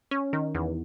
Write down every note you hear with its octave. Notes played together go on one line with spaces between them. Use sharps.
C#4
D#3
E2